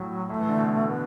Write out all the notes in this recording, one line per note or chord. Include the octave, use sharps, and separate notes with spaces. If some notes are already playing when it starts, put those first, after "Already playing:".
Already playing: A2 F#3
A2 A3
E3
D3
B2
B3